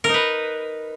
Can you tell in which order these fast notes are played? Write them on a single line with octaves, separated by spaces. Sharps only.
A#4 D#4 B4